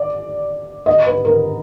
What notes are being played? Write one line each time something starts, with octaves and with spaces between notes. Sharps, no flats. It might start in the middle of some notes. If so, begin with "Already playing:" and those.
Already playing: D5
D#5
B4
A#4